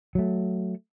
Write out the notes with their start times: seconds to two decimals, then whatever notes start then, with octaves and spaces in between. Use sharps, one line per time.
0.15 F#3 A3